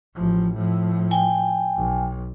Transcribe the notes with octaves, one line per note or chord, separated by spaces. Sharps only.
A1 F3
A2 F3
G5 G#5
B1